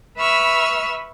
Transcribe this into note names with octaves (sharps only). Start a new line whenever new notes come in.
B4 E5 B5 C#6 E6 F6